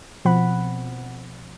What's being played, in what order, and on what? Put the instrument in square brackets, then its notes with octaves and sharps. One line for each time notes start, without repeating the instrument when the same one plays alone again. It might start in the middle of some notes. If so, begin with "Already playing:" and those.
[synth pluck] B2 F3 C4 F#5 B5